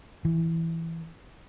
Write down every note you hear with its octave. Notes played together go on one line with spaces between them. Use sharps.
E3